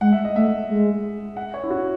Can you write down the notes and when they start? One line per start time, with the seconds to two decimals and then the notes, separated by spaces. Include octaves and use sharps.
0.01 G#3 F#5
0.12 E5
0.24 D#5
0.36 A3 E5
0.69 G#3
1.37 F#5
1.54 C#5
1.64 E4
1.70 F#4